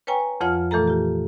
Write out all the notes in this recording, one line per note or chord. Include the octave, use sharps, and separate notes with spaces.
B4 C#5 G5 G#5 A#5 C#6
F2 F3 F4 C#5 F#5 F6
A#2 E3 A3 A4 A#5
F4 G4